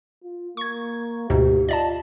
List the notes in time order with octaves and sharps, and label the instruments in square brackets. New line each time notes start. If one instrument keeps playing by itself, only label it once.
[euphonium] F4
[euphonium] A#3 [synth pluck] C#6 G#6
[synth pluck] D2 G#2 B2 [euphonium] G4
[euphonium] F4 [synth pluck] D5 D#5 A5